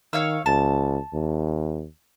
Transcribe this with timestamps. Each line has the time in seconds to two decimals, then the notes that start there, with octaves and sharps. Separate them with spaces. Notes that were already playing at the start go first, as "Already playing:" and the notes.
0.13 D#3 C#5 F5 E6
0.46 C#2 A5
1.14 D#2